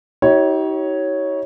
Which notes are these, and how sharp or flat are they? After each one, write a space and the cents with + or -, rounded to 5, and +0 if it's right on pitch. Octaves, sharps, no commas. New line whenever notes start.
D#4 +40 G4 -40 C#5 +0